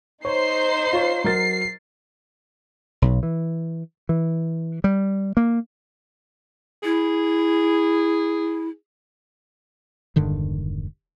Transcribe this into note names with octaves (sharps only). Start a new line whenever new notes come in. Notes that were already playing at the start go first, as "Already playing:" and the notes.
D#4 C5 C#5 C7
F4 C#5
F#3 A#4 A6 C7
B1
E3
E3
G3
A#3
E4 G#4
E1 G2 D3 D#3